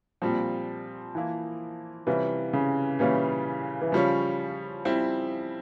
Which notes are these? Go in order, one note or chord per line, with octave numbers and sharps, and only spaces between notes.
A#2 F3 G3 C4
E3 A#3 E4
C3 E3 G3 C#4 F4
C#3
A#2 E3 G3 C#4 F4
E3
C#3 F3 G3 C#4
G3 C4 E4